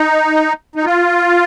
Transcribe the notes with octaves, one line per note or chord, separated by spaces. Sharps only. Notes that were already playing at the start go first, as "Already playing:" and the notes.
Already playing: D#4
D#4
F4